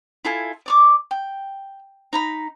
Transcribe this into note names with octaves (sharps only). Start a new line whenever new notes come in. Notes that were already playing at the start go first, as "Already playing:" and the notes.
E4 F4 A4 G#5
D5 C#6 D6
G5
D#4 A#5 B5